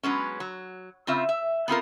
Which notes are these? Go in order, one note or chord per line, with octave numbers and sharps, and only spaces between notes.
F#3 G#3 B3 C#4
F#3
C#3 C4 F4 E5
E5
B3 C4 F4 A#4